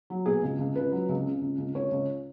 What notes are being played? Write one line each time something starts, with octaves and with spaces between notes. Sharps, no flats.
F#3
B2 G#4
C#2
C#2
C#2 B4
F#3
C#2
C#3
C#2
C#2
C#2 C#5
C#2